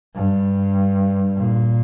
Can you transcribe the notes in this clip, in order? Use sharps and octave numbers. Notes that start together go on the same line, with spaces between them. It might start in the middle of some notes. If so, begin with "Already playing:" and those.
G2
A#2